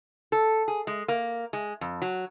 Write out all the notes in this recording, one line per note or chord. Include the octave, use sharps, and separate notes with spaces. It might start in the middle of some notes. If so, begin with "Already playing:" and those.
A4
G#4
G#3
A#3
G#3
F2
F#3